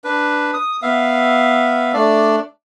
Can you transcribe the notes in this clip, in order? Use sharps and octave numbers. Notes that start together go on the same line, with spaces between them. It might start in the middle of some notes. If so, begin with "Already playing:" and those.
D4 B4
D#6
B3 E5 F5
A3 D4 D5